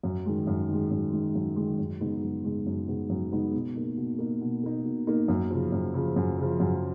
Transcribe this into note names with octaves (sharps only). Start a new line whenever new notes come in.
F#2
D#3 G#3
F#2
D#3 G#3
F#2
D#3 G#3
F#2
D#3 G#3
F#2
C#3 G#3 B3 D#4
F#2
C#3 G#3 B3 D#4
F#2
C#3 G#3 B3 D#4
F#2
C#3 G#3 B3 D#4
B2
A#3 D#4
B2
A#3 D#4
B2
A#3 D#4
B2
A#3 D#4
F#2
C#3 F3
F#2
C#3 F3
F#2
C#3 F3
F#2